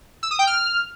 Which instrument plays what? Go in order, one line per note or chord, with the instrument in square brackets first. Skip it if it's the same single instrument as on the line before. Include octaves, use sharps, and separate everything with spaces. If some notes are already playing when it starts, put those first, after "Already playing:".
[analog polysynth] E6
D#6
G5
F6